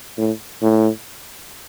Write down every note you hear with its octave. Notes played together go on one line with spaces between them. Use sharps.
A2
A2